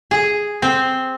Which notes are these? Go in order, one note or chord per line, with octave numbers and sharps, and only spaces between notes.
G#4
C4